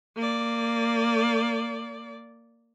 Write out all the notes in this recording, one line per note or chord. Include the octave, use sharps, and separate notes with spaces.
A#3 D5